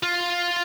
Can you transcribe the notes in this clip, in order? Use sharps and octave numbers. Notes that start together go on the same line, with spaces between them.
F4